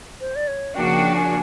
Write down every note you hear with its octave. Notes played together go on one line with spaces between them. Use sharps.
C5
D5
C#5
C#3 F3 A#3 D4 F#4 G5
F#5
G5
G#5